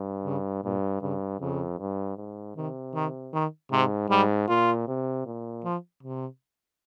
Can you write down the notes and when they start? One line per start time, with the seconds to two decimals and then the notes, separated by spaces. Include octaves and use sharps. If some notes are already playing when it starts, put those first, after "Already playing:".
Already playing: G2
0.25 C#3
0.64 G2 A#2
1.02 G2 C#3
1.40 F2 C#3
1.79 G2
2.17 G#2
2.56 C3 D#3
2.94 D#3
3.33 D#3
3.71 G#2 C3
4.10 G#2 G3
4.48 A#2 F4
4.88 C3
5.26 A#2
5.64 F3
6.03 C3